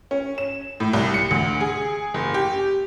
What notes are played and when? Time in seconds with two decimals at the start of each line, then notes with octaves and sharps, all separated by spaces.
0.11 C#4
0.38 E7
0.80 A2
0.93 C2
1.14 C#7
1.31 D2
1.61 G#4
2.14 F#1
2.34 G4